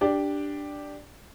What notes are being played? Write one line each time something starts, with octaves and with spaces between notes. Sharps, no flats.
D4 G4 D5